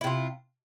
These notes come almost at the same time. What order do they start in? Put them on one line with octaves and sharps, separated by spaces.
E4 C3 F4